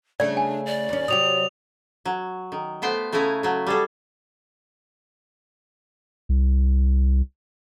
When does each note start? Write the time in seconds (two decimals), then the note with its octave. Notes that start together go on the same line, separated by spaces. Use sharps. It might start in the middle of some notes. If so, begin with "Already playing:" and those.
0.20 C#3 A3 D4 D5
0.37 G#5
0.66 D5
0.89 D#2 C#4
1.08 C3 F#3 G4 D#6 F7
2.05 F#3
2.52 D#3
2.82 A3 B3 C5 G5
3.12 C#3 A3 E4 G#5 A#5
3.43 F#3 A3
3.67 G3 G#4 A4
6.29 C2